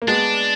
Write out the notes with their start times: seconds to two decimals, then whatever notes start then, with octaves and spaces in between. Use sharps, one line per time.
0.02 A#3
0.08 G#3 B3 D4